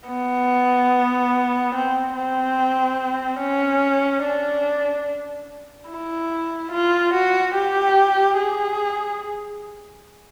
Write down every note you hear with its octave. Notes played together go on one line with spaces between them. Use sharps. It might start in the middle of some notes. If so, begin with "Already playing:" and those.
B3
C4
C4
C#4
D4
E4
F4
F#4
G4
G#4